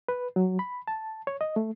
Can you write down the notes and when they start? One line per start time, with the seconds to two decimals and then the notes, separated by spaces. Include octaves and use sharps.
0.08 B4
0.36 F#3
0.59 B5
0.88 A5
1.27 C#5
1.41 D#5
1.56 A3